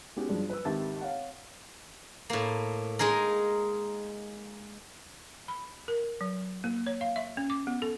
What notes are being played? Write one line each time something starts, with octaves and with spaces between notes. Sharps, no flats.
G#3 B3 C#4 D#4 F#4 G4
G2 F3 F#3 G#3 D4
B4 E6
G#1 D#3 G4 E5 A5 A6
C#5 F5 F#5
A2 A#3
G#3 D#4 G#4 A#4
B5
A#4
F#3
A#3
C#5
F5
E5
C#4
D6
B3
A4